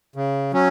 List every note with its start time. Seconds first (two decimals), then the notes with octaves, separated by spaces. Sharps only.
0.16 C#3
0.53 F#3 C#4